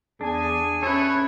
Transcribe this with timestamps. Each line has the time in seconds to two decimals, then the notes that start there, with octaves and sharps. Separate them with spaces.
0.21 E2 D4 G#4 G#5
0.83 C#4 E4 A4 B4 C#5